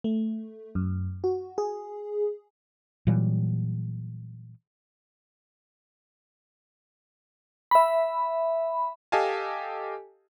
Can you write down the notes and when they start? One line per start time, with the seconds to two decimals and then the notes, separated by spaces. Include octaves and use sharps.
0.04 A3
0.75 F#2
1.24 F#4
1.58 G#4
3.07 A#2 E3 F#3 G3
7.71 E5 B5
9.12 G4 A4 D#5 F5 G#5 A5